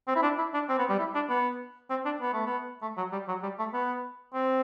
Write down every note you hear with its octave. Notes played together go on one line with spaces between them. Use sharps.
C4
E4
D4
E4
D4
C4
B3
G3
E4
D4
B3
C4
D4
B3
A3
B3
A3
F#3
G3
F#3
G3
A3
B3
C4